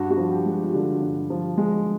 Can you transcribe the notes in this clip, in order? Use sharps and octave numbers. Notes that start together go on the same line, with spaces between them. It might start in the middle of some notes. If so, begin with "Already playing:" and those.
Already playing: G2 F#4
F#4
F3
G4
G#3
G4
F4
D3 F#4
G2
F3
G#3